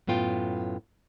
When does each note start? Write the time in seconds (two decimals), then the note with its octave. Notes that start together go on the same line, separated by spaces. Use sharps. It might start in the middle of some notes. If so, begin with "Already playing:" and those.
0.07 F#2 A2 B3 F4 G5